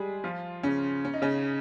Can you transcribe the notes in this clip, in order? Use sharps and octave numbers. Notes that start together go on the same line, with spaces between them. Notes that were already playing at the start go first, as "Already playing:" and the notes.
Already playing: G3 G#3 G#4
F3 F4
C#3 C#4
C#4
D#4
C#3 C#4